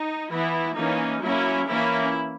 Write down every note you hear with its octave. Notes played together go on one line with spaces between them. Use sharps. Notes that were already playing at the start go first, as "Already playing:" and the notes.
Already playing: D#4
E3 B3 E4
E3 A#3 C#4 D#4
F#3 A#3 C#4 E4
E3 A#3 C#4 E4